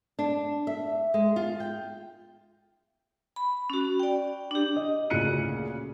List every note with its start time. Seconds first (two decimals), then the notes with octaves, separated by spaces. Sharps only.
0.19 D4
0.67 E5
1.14 G#3
1.36 F4
1.60 G5
3.36 B5
3.70 C#4 F#4
4.00 D5 G5
4.51 D4 G4
4.76 D#5
5.10 D2 A#2 C#3 F#6 C#7 D#7